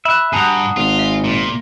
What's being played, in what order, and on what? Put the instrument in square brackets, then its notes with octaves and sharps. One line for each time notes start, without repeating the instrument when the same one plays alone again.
[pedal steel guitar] E5 [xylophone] B5 F#6
[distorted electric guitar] G2 [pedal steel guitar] F#4 G#4 [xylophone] A5 A#5 D#6
[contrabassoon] G#1 [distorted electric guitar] F4
[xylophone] E5
[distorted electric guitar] A#2